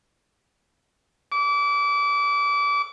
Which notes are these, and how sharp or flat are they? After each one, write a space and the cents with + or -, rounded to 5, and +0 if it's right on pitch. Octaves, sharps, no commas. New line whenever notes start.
D6 -30